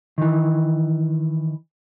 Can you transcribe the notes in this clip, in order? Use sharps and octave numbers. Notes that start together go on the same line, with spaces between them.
D#3 E3